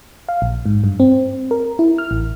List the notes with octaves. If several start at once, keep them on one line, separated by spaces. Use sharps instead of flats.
F5
A#1
G#2
G2
C4
A#4
E4
F6
A1